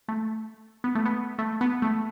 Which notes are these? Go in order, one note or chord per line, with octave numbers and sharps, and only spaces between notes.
A3
B3
A3
B3
A3
B3
A3